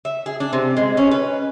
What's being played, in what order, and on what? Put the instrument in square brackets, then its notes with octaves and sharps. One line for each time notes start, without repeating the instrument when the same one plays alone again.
[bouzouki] E5
G#4
D4
C3
G#3
C#4
B4